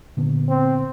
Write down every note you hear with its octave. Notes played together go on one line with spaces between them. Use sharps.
A#2 D3 B3
C4